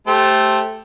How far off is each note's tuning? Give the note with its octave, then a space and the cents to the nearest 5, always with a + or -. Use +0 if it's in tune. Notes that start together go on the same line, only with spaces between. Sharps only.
A3 -5 G4 +0 C5 +15